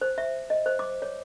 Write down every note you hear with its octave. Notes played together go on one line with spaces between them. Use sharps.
C5
E5
D#5
C5
D6
C#5